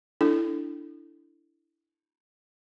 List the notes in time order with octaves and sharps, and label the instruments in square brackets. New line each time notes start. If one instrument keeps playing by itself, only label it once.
[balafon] D4 E4 A4